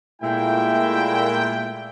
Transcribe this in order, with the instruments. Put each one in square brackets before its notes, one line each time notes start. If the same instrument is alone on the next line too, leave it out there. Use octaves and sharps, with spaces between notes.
[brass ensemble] A#2 G5 [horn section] G#3 A3 E4